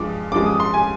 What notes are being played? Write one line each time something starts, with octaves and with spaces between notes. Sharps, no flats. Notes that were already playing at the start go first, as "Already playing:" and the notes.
Already playing: G2 F3 G#3 D6
G2 F3 G#3 D6
D#6
C6
G#5